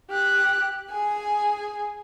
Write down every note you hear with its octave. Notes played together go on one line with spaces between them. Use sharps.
G4 F#6
G#4 G#5